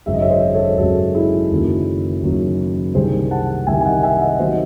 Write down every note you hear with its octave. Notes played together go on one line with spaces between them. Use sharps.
G#1 F#2 C#3 E5
D#5
C#5 E5
C5 D#5
A4 C#5
G#1 F#2 C#3 F#4 A4
E4 G#4
F#1 F#2 D#3 F#3
F#1 F#2 D#3 F#3
C2 C3 D#3 G#4 C5
F#5 A5
C2 C3 D#3 E5 G#5
G#5
D#5 F#5
E5 G#5
D#5 F#5
C3 D#3 F#3 C5 D#5